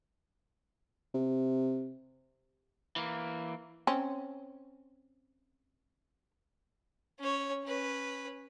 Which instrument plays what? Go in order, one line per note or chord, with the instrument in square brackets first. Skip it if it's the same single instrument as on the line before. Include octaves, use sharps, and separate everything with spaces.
[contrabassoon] C3
[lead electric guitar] E3 A#3
[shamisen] C4 C#4
[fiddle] C#4 C#5
C#4 B4